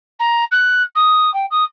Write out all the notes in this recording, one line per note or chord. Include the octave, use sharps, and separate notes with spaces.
A#5
F#6
D#6
G5
D#6